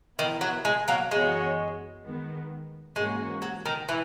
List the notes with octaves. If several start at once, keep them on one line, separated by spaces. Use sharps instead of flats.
D#3 E3 B3 E4 A#4
F#3
G#3
F#3 A#3
F#2 E3 G#3 B3 F#4 C#5
D#3 G#3 B3
G#2 E3 G#3 A#3 C#4 F#4
F#3
D#3
E3